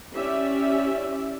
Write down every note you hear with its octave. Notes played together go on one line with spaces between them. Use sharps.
C#4 E4 G4 D5 E5